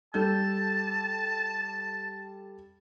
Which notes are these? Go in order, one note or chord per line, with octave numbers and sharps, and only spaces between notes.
G3 A4 A5 G6